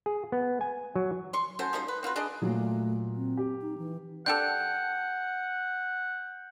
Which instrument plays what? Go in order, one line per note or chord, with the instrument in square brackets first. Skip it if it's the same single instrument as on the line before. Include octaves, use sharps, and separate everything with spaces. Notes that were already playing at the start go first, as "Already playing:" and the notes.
[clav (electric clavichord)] G#4
B3
G#5
F#3
[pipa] C6 C#6
A3 C#4 F#4 C5
F3 G3 D#4 C5
B4
C4 F4 F#4 B4
D4 G#4 D5 D#5
[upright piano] A#2 F#3 [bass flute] A3
[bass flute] C4
[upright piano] G4
[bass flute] D#4
E3
[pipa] D4 G4 A4 [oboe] F#5 [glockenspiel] G6